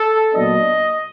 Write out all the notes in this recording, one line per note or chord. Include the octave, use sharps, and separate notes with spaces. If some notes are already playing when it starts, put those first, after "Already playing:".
Already playing: A4
A#2 F#3 B3 D4 D#5